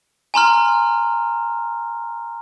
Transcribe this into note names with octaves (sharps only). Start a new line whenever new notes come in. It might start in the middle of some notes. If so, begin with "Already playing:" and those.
G#5 A#5 C6 F6